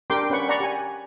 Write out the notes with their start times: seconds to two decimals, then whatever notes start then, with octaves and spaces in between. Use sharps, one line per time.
0.10 D4 G4 A#4 G5 C6 D6
0.30 C#4 B4 F#5 C#6
0.49 D5 F#5 A#5 B5 C#6
0.60 G4 G#5